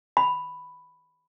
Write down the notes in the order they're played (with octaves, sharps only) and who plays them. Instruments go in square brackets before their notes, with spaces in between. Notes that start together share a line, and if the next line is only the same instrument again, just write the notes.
[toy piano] B5